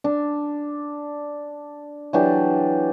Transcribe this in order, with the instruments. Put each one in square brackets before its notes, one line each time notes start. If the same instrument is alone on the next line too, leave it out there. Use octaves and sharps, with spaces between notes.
[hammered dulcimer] D4
E3 F#3 D4 G4